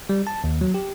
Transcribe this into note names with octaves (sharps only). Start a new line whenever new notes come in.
G3
A5
D#2
F#3
G4